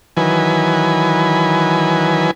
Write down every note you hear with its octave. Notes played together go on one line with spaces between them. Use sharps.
D#3 E3 F#3 B4 G#5